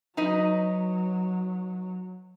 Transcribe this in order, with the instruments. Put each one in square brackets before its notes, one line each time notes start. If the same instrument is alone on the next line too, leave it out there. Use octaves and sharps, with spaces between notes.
[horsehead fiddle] F#3 [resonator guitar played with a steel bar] D#4 B4 D#5